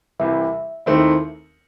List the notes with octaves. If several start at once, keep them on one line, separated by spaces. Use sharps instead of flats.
C2 C3 E3 G3 E5
D#2 D#3 A3 C4 E4